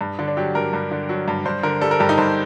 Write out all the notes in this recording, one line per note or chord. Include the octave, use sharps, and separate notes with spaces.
G2
D3
D4
F#3 G4
G2 A#4
G2
D3
F#3
G2
G2 C5
D3 A#4
G3 A4
A#4
G2 G4
D#4
G2 C5